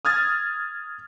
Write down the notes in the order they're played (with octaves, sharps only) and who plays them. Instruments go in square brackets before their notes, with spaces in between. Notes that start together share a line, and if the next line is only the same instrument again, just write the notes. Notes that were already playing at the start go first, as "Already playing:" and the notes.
[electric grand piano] D#6 F6 G#6 A6